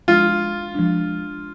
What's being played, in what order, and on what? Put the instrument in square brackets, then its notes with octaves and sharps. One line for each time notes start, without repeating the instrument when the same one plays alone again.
[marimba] F3 G#3 D4 [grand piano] F4
[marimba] F3 G#3 D4